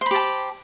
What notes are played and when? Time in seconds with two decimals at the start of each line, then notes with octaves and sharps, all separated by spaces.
0.01 C5
0.06 B5
0.11 G4
0.16 A5